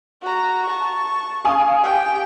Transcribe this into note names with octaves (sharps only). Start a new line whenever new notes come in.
F#4 A#5
A5 C#6
F5 G#5 D#6
G4 G5